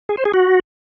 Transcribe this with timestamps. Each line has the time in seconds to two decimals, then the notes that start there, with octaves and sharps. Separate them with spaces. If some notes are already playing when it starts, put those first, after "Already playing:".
0.09 G#4
0.17 C5
0.25 G#4
0.34 F#4